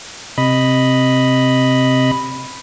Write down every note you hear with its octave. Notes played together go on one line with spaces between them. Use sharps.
C3 D#5 B5